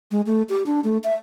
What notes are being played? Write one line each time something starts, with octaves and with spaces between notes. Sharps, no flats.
G#3
A3
G4
D4
A3
E5